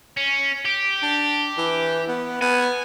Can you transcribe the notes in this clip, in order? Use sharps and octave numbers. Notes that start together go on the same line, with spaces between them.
C#4
G4
D4
E3
B3
B3 G#5